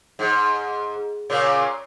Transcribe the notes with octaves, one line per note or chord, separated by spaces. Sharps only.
G#2
A#2 C#3 C#4